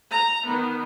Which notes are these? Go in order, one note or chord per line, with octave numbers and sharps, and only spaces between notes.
A#5
D#3 B3